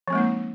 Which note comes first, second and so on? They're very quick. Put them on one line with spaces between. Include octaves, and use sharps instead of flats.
F3 C4 G#3 A#3 D#4